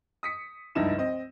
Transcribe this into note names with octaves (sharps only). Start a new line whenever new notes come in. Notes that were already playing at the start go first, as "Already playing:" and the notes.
D#6 B6 C#7
F1 C#2 G2 D#4 E4 E7
C4 D#5